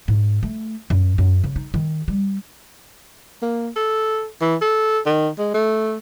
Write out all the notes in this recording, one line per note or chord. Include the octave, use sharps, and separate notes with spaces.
G#2
A3
F#2
F#2
C#3
D#4
D#3
G3
A#3
A4
E3
A4
D#3
G#3
A3